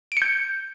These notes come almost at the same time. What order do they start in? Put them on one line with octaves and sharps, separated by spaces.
D7 C#7 G6